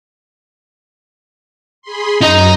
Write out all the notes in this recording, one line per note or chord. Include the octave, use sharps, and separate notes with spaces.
G#4 B5 C6
F#2 D#4 D#5